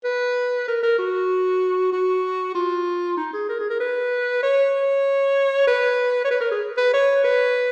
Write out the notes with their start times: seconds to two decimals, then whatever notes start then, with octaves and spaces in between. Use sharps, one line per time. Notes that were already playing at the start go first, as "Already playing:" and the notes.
0.04 B4
0.68 A#4
0.83 A#4
0.98 F#4
1.92 F#4
2.55 F4
3.17 D#4
3.33 G#4
3.49 A#4
3.60 G#4
3.70 A#4
3.80 B4
4.43 C#5
5.67 B4
6.24 C#5
6.31 B4
6.41 A#4
6.51 G#4
6.77 B4
6.93 C#5
7.24 B4